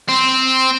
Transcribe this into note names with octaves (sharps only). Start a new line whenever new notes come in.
C4